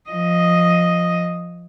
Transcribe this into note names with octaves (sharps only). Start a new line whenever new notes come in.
F3 D#5